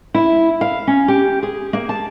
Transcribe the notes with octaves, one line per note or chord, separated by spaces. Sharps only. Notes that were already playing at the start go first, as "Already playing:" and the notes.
E4
F5
C#4
G4
G#4
A#3
A5